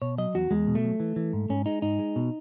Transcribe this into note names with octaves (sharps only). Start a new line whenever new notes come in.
B2 C#5
F#3 D#5
E2 F#4
E2 G#3
B2
A3
F#3
E3
E3
G#2
G#2 C#4
G#3 D#4
G#2 D#4
G#3
B2